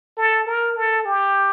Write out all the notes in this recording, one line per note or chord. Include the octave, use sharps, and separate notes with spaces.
A4
A#4
A4
G4